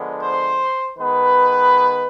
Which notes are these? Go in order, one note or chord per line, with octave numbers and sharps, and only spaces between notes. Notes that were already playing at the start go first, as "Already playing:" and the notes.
Already playing: D3 F3 G#3 B3
C5
D#3 G#3 B3 B4